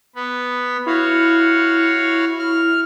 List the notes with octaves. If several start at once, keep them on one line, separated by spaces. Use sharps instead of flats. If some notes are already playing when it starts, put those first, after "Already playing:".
B3 B4
E4 F#4 C#5 F5
F6